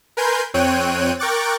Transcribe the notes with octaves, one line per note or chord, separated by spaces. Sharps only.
A#4 B4 G#5 C6 G6
F2 C4 C#5 G5 F#6 D#7
A#4 G5 C#6 D6 F#6 A6